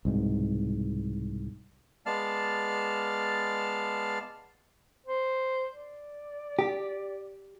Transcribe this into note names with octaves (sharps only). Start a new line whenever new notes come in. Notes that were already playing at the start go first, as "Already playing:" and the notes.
C2 G#2 B2
G#3 B3 D5 F5 A5 F6
C5
D5
G4